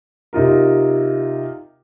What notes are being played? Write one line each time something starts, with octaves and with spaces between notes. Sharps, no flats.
C3 D#4 F4 A#4